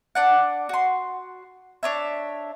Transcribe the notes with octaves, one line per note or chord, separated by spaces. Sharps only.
D4 D5 F#5
F#4 C6
D4 C#5 E5